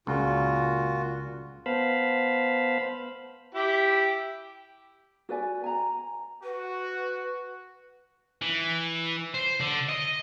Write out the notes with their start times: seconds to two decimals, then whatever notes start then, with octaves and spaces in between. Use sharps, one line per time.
0.07 C#2 A#2 F4 F#4
1.66 B3 C5 F5 A5 B5
3.55 E4 G4
5.29 F#4 B4 D5 G#5
5.64 G#5 A#5
6.43 F#4 B4
8.41 E3
9.34 C5
9.61 D3
9.89 D#5